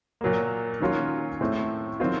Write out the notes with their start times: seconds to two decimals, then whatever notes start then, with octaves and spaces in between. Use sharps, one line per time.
0.21 A#2 F#3 A#3
0.80 D#3 F#3 A#3 C#4 F4
1.41 A2 A3 C4
2.00 D#3 F#3 C4 F4